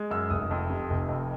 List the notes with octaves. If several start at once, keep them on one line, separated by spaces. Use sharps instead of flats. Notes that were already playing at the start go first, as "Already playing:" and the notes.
Already playing: G#3
F#2 E6
F1 D#6
F2
C3
F1
F2